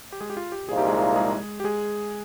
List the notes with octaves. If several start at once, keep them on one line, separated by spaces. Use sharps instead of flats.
G4
G#3 G#4
G4
F4
G4
C2 A#2 F3 A#3 D#4 G#4
G4
G#3 G#4
G#3 G#4
G4
G#3 G#4